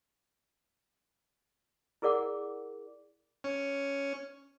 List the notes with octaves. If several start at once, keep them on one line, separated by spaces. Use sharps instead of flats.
E4 G#4 A#4 D5 F#5 D6
C#4